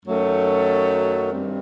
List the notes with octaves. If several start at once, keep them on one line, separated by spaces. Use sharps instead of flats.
F#2 D#3 F#3 A3
G2 D#3 G3 C4